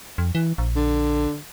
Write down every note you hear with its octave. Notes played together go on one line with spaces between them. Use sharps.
F2
E3
A#1
D3